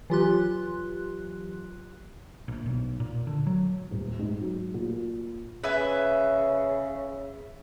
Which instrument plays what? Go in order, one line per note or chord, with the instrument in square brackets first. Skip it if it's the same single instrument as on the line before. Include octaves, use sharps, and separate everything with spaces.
[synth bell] E3 F#3 F4 G4 C6 F#6
[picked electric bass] A#1
B1
A#2
D3
F#3
[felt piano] D#1
G#2
F#3
A#2
[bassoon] C#3 [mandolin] B4 E5 G#5